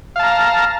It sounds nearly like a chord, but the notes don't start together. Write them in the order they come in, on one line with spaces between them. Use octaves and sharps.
F5 A5 A#5